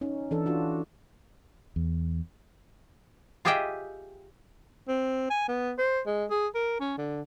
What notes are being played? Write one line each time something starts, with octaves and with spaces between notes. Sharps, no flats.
C#4 D#4
E3 D4 A4
D4 F4 F#4
E2
F4 G4 G#4 D#5 E5 G5
C4
G#5
B3
C5
G#3
G#4
A#4
C#4
D3